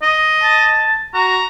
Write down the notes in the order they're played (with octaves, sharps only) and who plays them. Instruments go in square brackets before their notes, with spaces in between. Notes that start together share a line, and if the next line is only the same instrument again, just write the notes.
[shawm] D#5
[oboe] A5
[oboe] F#4 [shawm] A#5